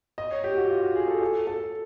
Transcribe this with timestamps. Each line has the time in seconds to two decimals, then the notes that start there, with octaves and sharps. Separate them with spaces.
0.18 D#5
0.31 C#5
0.44 G4
0.57 F#4
0.70 F4
0.83 F#4
0.95 G#4
1.08 A4
1.22 A4
1.47 A4